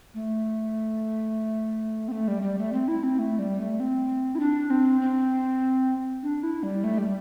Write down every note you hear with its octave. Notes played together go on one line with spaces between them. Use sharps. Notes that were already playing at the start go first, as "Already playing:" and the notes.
A3
C4
A3
G3
G3
A3
C4
E4
C4
A3
G3
A3
C4
E4
D4
C4
C4
D4
E4
G3
A3
G3